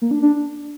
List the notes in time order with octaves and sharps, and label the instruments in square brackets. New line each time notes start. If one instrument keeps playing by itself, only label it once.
[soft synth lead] A#3
D4
D4